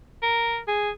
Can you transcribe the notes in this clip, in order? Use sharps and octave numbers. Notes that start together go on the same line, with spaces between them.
A#4
G#4